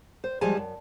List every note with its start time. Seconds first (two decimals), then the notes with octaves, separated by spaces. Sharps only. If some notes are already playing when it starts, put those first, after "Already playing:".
0.24 C5
0.41 F3 G3 G#3 G#4 G#5 A5
0.57 F#2